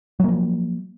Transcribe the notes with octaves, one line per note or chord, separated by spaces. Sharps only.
F3 F#3 A#3